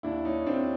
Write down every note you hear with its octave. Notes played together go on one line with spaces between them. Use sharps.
D#2 D4 E4
C#4 D#4
D#2 C4 D4